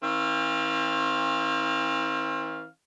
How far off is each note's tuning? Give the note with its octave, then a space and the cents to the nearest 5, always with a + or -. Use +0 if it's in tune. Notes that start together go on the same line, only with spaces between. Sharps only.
E3 -45 C4 +35 F5 +0